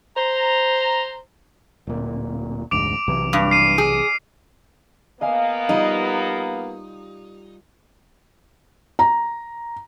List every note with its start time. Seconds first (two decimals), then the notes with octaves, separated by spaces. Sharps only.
0.16 C5 A#5
1.87 D1 A#2
2.71 F1 D2 G#2 D6 D7 F7
3.07 B1 C3 E3
3.33 G2
3.50 F6 C7 D#7
3.78 G#4
5.21 A#3 B3 D#5 F5 G#5
5.69 G3 D#4 F4
8.99 A#5